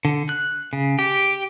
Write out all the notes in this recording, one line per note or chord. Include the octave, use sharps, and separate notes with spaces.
D3
F#6
C#3
G4